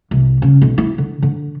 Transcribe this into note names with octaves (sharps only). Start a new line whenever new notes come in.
C2
C#3
B1
E4
D3
D3